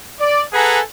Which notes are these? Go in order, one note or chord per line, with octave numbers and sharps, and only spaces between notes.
D5
G#4 A4 B4 F#5 G#5 A#5